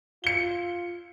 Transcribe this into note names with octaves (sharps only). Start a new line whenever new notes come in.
F4 C#7 G7